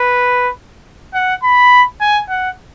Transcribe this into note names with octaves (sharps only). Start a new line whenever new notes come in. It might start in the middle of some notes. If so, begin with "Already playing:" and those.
Already playing: B4
F#5
B5
G#5
F#5